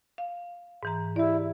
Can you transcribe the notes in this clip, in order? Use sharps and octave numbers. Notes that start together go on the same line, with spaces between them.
F5
G#2 E3 A#5
E4 G4 D5